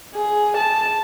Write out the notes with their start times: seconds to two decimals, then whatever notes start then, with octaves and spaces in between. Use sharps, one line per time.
0.15 G#4
0.57 A5